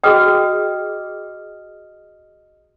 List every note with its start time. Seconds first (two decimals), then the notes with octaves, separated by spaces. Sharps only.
0.04 F#4 G#4 D#5 G5 D#6 F6